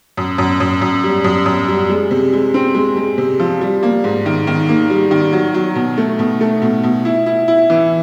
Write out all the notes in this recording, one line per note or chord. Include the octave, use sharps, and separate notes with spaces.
F#2
F#2
F#2
F#2
G3
F#2
F#2
G3
G#3
C3
G#3
C4
G#3
G#3
C3
F3
G3
A#3
G#2
D#3
D#3
A#3
G3
D#3
F#3
F#3
B2
A3
B2
A3
B2
B2
E4
E4
E4
E3